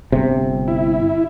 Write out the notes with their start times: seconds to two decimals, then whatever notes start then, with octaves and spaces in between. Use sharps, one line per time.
0.12 G1 C3
0.68 E4